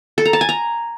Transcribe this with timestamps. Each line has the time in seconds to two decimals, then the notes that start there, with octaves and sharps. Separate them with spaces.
0.18 A4
0.25 A#5
0.33 A5
0.41 G#5
0.49 A#5